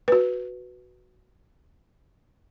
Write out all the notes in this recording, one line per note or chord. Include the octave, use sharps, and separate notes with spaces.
F#4 B4